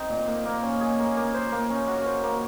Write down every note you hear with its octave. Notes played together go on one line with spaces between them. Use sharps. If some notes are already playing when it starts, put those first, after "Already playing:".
Already playing: C4 D#4
A#2
A#3
A#3
C#4
G#4
A#3
A#3
C5
A#3
C#4
F#4
C5
A#3